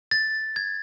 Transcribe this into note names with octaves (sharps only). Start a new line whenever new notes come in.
A6
G#6